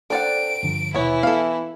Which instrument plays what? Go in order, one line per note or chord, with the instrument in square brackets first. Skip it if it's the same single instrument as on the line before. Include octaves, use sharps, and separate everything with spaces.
[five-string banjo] D4 D5 F#5 [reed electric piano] A4 C5 G5 [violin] D7
[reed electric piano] G2 D3 F3
[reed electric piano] D#2 B2 [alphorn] E3 [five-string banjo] B3 C#5 [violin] E4
[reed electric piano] B3 [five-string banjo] A4 F5